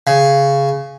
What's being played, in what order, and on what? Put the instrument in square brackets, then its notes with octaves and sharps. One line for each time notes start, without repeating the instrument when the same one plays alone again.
[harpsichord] C#3